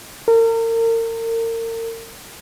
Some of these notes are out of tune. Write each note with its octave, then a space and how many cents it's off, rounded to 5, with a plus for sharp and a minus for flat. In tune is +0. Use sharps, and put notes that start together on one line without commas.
A#4 -35